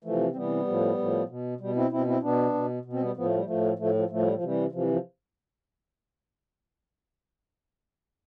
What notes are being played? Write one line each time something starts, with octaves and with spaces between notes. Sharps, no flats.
C3 E3 F3 A3
C4
C3 E3 G3 B3
A2 F3
A2 F3
B2
B2 G3
C4 E4
B2 C4 E4
C4 E4
B2 B3 D4
B2
B2
C4
G3 B3
A2 F3 B3
A3
G3
F3 A3
A2
A2 F3 A3
F3
A2 F3 A3
G3
F3
C3 E3 G3
C3 E3 F3
G3
F3